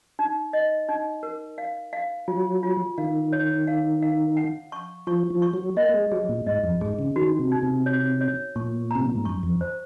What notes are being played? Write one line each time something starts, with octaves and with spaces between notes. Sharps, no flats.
D#4
D#5
D#4
A#4
F5
F5
F#3 F4
F4
D#3 F5
C#5
F5
F5
F#5
C#6
F3 C#6
F3
C#6
F#3
A#3 D#5
G#3
F#3 G#4
A#2
G#2 D#5
F2
G#2 G#4
C#3
D#3 F#4
C3
D#4
C3
C#5
C#5
A#2 C#6
C3 A#5
A#2
G#2
F#2 C#6
F2
C5